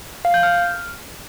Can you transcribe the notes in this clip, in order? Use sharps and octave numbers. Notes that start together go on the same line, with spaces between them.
F5
G6
F6